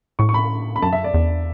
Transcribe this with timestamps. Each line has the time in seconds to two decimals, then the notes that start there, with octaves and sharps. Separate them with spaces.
0.19 A2 C#6
0.29 C#6
0.34 B5
0.76 B5
0.82 F#2 A5
0.93 E5
1.04 D5
1.14 E2